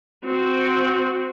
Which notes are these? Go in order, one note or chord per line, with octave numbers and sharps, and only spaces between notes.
C4 F#4